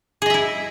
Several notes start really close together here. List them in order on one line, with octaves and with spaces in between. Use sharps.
G#4 D#5 E5 E4